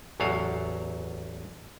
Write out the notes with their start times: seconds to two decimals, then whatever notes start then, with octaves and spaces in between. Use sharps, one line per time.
0.20 A1 E2 F#3 A4 F5